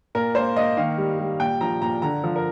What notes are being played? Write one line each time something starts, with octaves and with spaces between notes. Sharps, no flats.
A#2 A#4
A#3 C5
A#3 D#5
D#3 F5
G3
G3
A#2 G5
F3 A#5
A#2 A#5
D3 A#5
F3
A#4